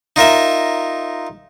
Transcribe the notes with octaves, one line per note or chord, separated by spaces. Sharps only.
D#4 F4 A#4 E5